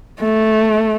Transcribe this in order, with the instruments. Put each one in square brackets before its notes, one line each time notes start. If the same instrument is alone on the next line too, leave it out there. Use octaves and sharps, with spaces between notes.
[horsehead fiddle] A3